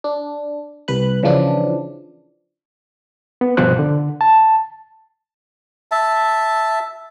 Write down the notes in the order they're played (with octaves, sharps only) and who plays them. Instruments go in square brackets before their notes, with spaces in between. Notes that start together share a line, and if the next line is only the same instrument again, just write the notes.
[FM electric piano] D4
C2 B4 F#6
C#3 E3 F3 D4
[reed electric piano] B3
C2 G2 B2 F3 C5 F#6
D3
A5
[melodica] E5 A5